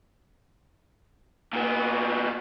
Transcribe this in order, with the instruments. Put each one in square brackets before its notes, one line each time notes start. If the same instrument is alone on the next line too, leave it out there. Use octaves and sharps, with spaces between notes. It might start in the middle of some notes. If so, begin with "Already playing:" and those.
[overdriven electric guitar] A#2 B3